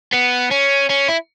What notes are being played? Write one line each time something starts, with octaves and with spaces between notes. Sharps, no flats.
B3
C#4
C#4
E4